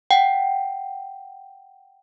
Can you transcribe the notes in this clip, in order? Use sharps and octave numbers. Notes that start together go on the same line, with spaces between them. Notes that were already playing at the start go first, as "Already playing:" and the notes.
F#5 G5